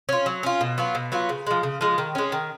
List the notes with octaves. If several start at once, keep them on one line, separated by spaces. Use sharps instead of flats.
C#4 F4
F#3
C#4 F4
B2
F#3 B3 F4
B2
F#3 B3 F4
C#3
F3 G#3
C#3
F3 G#3
D#3
G#3 C#4
D#3